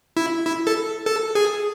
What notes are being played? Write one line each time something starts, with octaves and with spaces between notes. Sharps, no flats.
E4
E4
A4
A4
G#4